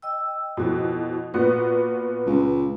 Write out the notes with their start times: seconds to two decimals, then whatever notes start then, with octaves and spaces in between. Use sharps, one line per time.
0.02 D#5 G5 E6
0.57 F2 B2 E4 F#4
1.34 A#2 B3 F#4 B4
2.26 C#2